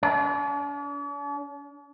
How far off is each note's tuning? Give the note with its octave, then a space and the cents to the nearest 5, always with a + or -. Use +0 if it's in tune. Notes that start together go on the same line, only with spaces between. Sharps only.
D4 -45